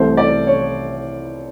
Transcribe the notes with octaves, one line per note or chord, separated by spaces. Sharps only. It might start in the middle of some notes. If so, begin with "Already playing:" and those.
Already playing: C2 C3 E3 A3 C5
D5
C#5